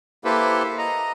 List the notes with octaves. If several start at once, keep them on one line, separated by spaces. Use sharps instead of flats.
A#3 E4 G4 A4 B4 C5
D#5 A#5